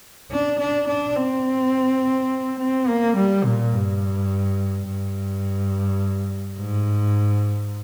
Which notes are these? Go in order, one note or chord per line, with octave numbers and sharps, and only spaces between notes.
D4
D4
D4
C4
C4
A#3
G3
A#2
G2
G2
G#2